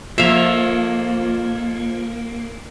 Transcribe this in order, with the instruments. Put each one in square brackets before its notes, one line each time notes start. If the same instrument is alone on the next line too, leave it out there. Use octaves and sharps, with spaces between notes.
[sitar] F2 F3 [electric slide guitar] A#3 [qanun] E5 F5